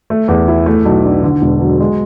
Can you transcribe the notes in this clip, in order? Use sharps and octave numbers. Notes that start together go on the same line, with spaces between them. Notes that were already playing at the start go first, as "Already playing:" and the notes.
A3
E2
E4
A3
B1
D4
D3
E1
F#3
G#3